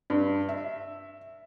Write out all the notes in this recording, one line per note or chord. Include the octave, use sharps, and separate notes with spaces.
G2
E5